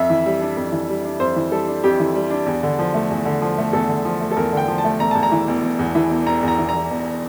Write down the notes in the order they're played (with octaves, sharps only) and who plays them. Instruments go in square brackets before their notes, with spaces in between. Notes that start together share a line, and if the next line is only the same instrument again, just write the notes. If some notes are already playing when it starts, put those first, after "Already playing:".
Already playing: [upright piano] F2 E5
E3
G3
D4
F2
E3
G3
D4
F2 C5
E3
G3 A4
D4
F2 G4
E3
G3
D4
E2
D3
F3
A3
E2
D3
F3
A3
E2 A4
D3
F3
A3
A4
E2 A#4
D3
G5
F3
A5
A3
E1 A#5
E2 A5
A#5
E3
E1
E1
E2
E3
E1
E1 A#5
E2 A#5
E3
A#5
E1
E1